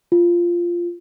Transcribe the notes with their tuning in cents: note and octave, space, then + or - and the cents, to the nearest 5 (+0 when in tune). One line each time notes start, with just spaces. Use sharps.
F4 -10